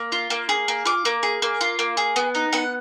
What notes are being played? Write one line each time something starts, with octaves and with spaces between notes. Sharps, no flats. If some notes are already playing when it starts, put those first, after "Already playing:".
Already playing: A#3
F4
A#3
G#4
A#3
F4 D6
A#3
G#4
A#3
F4
A#3
G#4
B3
D#4
B3 F#5